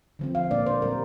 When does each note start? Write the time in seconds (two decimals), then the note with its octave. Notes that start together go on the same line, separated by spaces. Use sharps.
0.19 D3 F3 C4
0.35 F5
0.50 A#2 A#3 D4 D5
0.66 C5
0.82 A#2 G3 C4 A#4